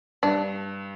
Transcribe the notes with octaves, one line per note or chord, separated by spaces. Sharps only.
G2 D4